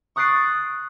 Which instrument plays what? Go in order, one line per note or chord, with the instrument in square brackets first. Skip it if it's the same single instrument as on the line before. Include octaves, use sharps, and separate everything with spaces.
[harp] C#6 D#6 F#6 A6 C7 D7